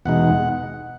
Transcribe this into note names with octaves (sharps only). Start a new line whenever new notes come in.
E2 B2 G#3 D#4 F#5